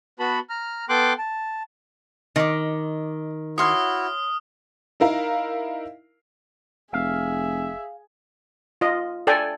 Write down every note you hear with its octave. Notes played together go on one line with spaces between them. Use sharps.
B3 F#4 B4 A5 B5
A#5 F6
B3 A4 G5 C6 D6 F#6
A5
D#3 D#5 D6
E4 F#4 C#5 C6 D#6 F6
D#4 E4 A#4 F5
F1 G#4 E5 F5
F4 D#5
A4 D5 G5 G#5